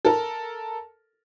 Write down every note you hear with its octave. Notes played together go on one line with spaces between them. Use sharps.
A4 A#4